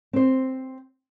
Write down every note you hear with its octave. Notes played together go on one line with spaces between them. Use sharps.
C4 C5